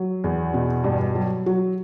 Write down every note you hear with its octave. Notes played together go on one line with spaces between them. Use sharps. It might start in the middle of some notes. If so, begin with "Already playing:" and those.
Already playing: F#3
E2
B2
G2
F#3
F#3